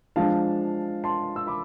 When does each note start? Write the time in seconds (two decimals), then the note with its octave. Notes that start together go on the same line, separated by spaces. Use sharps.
0.16 F3 G#3 D4 F5 A5
1.04 A5 C6
1.36 E6
1.47 B5 D6